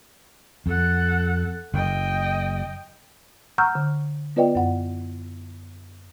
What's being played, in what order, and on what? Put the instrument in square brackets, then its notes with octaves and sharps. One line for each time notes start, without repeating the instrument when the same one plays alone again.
[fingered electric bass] F2 [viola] A4 F#5
[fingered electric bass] F#1 [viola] D#5 G5
[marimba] F#5 A#5 C#6 E6 F6 G6
D3
B3 F4 B4 D5 D#5 G5
F#2 F#5